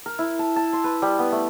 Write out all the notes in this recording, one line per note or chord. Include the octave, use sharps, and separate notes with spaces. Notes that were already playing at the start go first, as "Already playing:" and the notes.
A#4
E4
A5
A5
C6
B4
G3
B3
A3